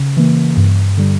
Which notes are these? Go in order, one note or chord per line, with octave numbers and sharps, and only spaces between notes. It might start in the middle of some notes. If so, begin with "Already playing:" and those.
Already playing: C#3
E3 A#3
G2
D3 G3